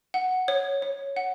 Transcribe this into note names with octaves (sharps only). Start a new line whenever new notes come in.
F#5
C#5
C#5
F#5